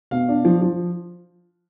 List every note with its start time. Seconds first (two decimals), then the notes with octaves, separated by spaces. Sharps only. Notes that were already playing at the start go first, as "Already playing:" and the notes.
0.11 B2 F5
0.29 D4
0.45 F3
0.62 F3